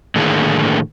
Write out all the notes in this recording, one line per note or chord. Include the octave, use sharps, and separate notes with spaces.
A2 D3 D#3 A#3 D4 G#4